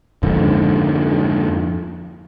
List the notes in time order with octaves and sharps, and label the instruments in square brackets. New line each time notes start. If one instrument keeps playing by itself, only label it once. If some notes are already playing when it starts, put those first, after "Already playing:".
[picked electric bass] F2 G#2 D3